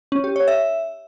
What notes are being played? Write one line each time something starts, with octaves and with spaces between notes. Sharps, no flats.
C#4
G4
C#5
E5